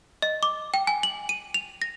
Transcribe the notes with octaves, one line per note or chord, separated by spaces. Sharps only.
D#5
D6
G5
G#5
F#7
D#7
F7
A#6